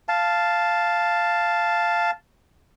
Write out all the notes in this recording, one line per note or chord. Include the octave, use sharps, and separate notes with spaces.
F5 A5